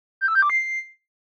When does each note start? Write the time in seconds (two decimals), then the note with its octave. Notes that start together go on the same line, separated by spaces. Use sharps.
0.21 G6
0.28 E6
0.35 G6
0.42 D6
0.50 C7